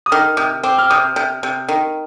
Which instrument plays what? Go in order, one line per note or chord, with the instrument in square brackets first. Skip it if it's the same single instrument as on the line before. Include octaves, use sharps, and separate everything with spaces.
[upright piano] D#6
[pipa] D#3 [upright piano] F6
[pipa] C3 [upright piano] D#6
[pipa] C4 [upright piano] D6
[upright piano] F6
[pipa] C3 [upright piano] D#6
[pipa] C3
C3
D#3